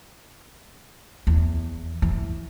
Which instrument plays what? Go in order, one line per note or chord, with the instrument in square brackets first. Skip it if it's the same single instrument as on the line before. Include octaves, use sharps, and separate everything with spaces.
[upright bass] E2
E3